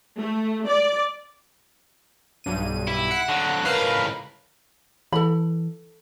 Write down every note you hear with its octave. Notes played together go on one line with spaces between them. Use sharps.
A3
D5
B1 G2 D#7
E4
F#5
D3 F#3
C#2 A2 A#4 B4 F5
E3 A4 B5